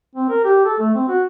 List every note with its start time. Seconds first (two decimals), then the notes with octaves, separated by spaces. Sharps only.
0.15 C4
0.30 A#4
0.44 G4
0.65 A4
0.79 A3
0.95 C4
1.08 F#4